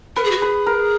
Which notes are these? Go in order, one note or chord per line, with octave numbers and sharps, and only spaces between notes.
A#4 B4
G#4
F#4
G#4 B4
A#4